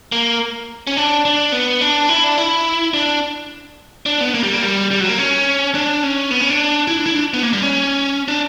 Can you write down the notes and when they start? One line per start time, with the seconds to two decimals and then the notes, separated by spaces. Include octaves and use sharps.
0.12 A#3
0.87 C#4
0.97 D4
1.25 D4
1.52 B3
1.81 D4
2.09 E4
2.24 D4
2.38 E4
2.94 D4
4.06 D4
4.20 B3
4.34 A#3
4.43 G3
4.53 A#3
4.62 G3
4.91 G3
5.01 F#3
5.09 A#3
5.19 C#4
5.75 D4
6.03 C#4
6.31 B3
6.41 C#4
6.50 D4
6.87 E4
6.97 D4
7.06 E4
7.15 D4
7.34 B3
7.43 A#3
7.53 G3
7.62 C#4
8.28 D4